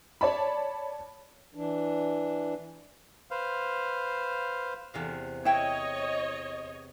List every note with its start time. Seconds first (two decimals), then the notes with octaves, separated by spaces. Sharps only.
0.21 C#5 D5 A5 B5
1.55 E3 D4
3.31 B4 C5 F5
4.94 E2 C3 F5
5.45 E4 C#5 D#5 G5